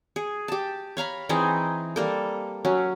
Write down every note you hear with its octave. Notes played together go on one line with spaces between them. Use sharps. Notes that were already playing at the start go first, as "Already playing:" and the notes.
G#4
G4 A5
C#5 F5 A#5 B5
E3 C4 D#4 G#4
G3 A#3 A4
F#3 C#4